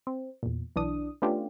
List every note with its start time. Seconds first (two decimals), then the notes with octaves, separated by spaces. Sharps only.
0.07 C4
0.43 E2 A#2
0.76 B1 E3 D4 D#6
1.22 A3 B3 C#4 D4 F4 G4